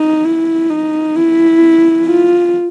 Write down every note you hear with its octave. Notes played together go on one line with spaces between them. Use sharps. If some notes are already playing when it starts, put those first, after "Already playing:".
Already playing: D#4
E4
D#4
E4
F4